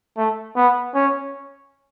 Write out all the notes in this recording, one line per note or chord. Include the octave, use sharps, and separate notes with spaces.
A3
B3
C#4